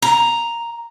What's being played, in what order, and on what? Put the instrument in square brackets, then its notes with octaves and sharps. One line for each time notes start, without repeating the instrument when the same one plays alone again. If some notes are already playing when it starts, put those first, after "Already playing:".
[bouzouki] A#5